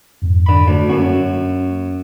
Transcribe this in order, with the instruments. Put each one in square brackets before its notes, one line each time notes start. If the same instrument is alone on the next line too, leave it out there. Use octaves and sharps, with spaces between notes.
[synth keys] F2 G#2
[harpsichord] D3 B5
D2
[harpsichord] F#2 F#4 [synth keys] A#3 C#4